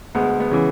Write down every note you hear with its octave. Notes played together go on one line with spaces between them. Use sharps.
D2 G#3 B3
G#3 B3
C#3 E3